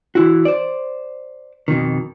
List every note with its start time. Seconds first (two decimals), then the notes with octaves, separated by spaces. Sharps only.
0.15 E3 E4 F#4
0.45 C5 D5
1.68 F2 B2 D#3